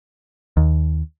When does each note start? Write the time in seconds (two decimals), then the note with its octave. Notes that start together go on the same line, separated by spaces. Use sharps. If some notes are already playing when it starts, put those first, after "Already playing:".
0.57 D#2